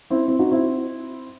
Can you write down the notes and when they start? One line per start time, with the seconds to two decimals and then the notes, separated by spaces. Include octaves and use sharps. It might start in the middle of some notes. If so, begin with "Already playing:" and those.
0.10 C4 E4
0.28 C4 E4
0.39 D#4 F#4
0.51 C4 E4